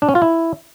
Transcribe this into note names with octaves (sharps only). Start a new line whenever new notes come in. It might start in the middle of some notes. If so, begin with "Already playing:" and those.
D4
C#4
F4
E4